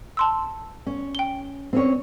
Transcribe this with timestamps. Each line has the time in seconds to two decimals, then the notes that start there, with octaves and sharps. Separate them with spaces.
0.17 A5 C6 E6
0.87 C#4
1.15 G5 G7
1.73 C4 C#4 C#5